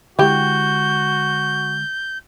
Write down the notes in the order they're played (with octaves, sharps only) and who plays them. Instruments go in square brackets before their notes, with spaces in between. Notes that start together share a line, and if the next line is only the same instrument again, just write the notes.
[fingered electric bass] D3 G#3 [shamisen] E4 G4 [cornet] F#4 [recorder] G6